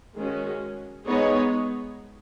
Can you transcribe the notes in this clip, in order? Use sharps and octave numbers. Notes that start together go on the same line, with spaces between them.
D#3 G#3 C#4 F#4
G#3 B3 D#4 G#4 C#5